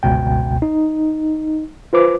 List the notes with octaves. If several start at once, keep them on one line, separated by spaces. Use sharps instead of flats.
G1 C#2 B2 G5
D#4
F4 B4 C5 D6